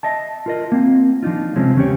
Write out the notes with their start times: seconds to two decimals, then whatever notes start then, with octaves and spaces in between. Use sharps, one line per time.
0.03 D#5 E5 A5
0.46 F4 A#4 D#5
0.72 A#3 C4
1.23 F3 D4 D#4 F4
1.56 C3 F3 G#3 C4 C#4
1.76 E2 C#3 C#4 G4 C#5